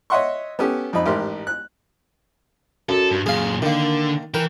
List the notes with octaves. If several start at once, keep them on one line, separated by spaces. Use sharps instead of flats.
C#5 D#5 E5 F#5 C6 C#6
B3 C#4 G4 A4
F2 F3 D#4 B5
A1 G#2 G4 A#4 E5 C6
F#6
F#2 A4
G2
F#2 A#2 G#4 F5
D3 D#3 A#3
E3 A#4 G5